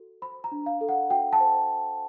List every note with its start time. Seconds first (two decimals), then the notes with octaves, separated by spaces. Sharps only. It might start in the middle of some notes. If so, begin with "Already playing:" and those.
Already playing: F#4 A4
0.22 C5 B5
0.44 A#5
0.52 D4
0.66 F5
0.81 A4
0.89 F#5
1.10 F#4 G5
1.33 A5
1.40 C5